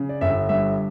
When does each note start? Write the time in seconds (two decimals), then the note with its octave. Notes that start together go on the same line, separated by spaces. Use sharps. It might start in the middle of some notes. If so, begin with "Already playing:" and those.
Already playing: C#3
0.09 D5
0.21 G1 E5
0.49 G2 E5